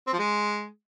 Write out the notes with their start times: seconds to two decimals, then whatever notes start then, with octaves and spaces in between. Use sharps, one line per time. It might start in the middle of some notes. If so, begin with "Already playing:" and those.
0.07 C4
0.13 F3
0.19 G#3